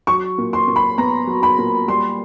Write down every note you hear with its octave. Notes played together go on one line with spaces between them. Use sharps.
F#3 C#6
A#2
C6
A#2
B5
B3 A#5
F#3
B5
A#2
G3 C6